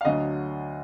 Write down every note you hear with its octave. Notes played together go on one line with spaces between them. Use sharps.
F5
D2 D3 F#3 D#5